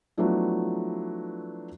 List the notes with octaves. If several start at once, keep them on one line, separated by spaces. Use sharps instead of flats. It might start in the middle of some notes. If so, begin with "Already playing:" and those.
F3 F#3 A3 B3 D4 E4